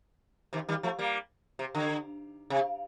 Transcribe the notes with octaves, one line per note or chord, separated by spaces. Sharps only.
C3 D#3
D#3 G3
F3 A3
G3 A#3
C3
D3
C3